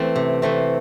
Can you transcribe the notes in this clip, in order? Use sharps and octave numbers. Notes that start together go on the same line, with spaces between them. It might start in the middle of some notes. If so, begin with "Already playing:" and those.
Already playing: E3 A3 C4
C3
E3 A3 C4